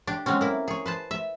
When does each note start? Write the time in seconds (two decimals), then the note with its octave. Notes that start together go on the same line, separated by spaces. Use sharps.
0.07 D4 G4
0.26 F#3 G#3 C4 C#4
0.41 A#3 E4
0.68 G#4 C#5
0.86 B4 C5 A5
1.11 E5